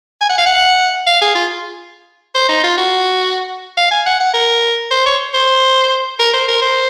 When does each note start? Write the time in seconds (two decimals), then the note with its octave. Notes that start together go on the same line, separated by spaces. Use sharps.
0.21 G#5
0.29 F#5
0.38 F5
0.46 F#5
1.07 F5
1.21 G#4
1.35 F4
2.35 C5
2.49 D#4
2.63 F4
2.77 F#4
3.77 F5
3.91 G#5
4.06 F#5
4.20 F#5
4.34 A#4
4.91 C5
5.06 C#5
5.34 C5
6.19 A#4
6.34 C5
6.48 A#4
6.62 C5